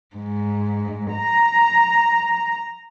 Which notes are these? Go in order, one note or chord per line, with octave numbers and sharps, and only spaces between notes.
G#2
A#5